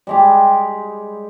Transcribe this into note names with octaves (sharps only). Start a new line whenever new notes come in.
G3 G#3 G4